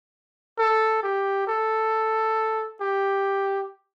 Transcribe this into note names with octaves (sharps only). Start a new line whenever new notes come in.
A4
G4
A4
G4